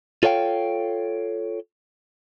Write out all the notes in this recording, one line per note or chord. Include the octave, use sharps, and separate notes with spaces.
F4 A4 C#5 F5 G5